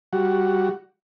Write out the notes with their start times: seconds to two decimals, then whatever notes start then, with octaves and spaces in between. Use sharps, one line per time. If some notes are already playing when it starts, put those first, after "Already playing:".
0.13 G3 F#4